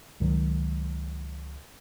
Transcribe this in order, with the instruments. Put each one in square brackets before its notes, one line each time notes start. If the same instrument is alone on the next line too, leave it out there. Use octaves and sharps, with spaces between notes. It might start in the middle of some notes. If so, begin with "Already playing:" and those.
[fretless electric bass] C#2 G#2 D#3 F#3